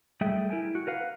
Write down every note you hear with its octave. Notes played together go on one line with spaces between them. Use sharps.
G3 A3 G#4 E5 G5
E4 A#4 G5 G#5
F#4
A#4 B4 F5 F#5